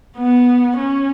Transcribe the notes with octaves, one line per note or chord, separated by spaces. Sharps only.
B3
C#4